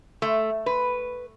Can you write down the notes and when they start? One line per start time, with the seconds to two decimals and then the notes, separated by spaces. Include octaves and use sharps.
0.22 A3
0.66 B4